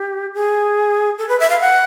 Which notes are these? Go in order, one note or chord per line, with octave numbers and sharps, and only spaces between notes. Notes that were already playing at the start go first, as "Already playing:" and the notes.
Already playing: G4
G#4
A4
B4
E5
F5
F#5